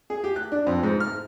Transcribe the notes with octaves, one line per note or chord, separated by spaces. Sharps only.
G#4
G4
F#6
D4
F2
G#2
F6